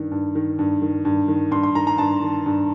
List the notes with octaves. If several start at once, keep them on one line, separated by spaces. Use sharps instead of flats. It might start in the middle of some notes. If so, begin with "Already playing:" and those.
Already playing: G2 D#3
G2
D#3
G2
D#3
G2
D#3
G2 C6
C6
D#3 A#5
A#5
G2 A5
D#3
G2